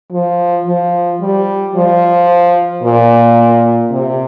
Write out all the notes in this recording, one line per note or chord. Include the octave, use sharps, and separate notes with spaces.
F3
F3
G3
F3
A#2
C3